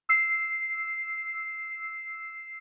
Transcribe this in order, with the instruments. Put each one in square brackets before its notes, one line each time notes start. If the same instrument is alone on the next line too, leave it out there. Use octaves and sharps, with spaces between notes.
[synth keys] E6 C7